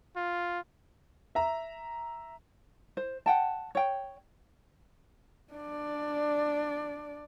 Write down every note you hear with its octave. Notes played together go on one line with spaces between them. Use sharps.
F4
E5 A#5
C5
F#5 G5 A5
C#5 G5
D4 D5